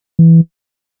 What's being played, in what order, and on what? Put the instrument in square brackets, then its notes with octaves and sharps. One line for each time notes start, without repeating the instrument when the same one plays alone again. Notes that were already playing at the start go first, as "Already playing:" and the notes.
[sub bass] E3